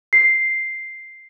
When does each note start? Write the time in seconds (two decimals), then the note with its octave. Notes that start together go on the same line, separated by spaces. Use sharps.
0.13 C7